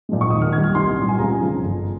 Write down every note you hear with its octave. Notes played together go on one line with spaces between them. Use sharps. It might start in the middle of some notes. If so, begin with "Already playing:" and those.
A#2 F3 G#3
C#6
D#2 D#6
F6
D#3 G#6
G3
F6
C2 C6
A#2 G3
G#5
C#2 A#5
C#3 F3
G1